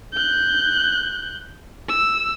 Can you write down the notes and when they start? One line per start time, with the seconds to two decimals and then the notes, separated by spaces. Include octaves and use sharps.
0.14 F#6 G6
1.89 E6